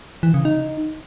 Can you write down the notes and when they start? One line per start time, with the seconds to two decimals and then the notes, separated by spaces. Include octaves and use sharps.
0.23 E3
0.34 C#3
0.45 D#4